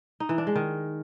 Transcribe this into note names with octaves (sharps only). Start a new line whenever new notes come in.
D#4
E3
D4
G#3
D#3